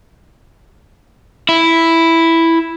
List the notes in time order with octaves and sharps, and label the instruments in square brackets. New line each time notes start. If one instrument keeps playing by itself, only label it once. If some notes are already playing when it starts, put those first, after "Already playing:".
[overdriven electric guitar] E4